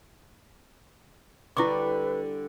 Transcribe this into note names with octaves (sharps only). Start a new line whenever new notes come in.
D3 G3 E4 B4 C#6 D6